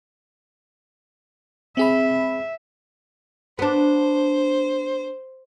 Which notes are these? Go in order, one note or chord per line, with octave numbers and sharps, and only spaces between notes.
C4 G#4 E5 B5
B3 D4 C5